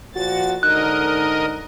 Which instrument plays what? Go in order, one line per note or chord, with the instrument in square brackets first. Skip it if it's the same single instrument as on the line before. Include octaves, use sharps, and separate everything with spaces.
[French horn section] A#2 F3 F#4 [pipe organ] A6
[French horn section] G#2 D3 D#4 [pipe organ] A#4 D#5 [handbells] F#6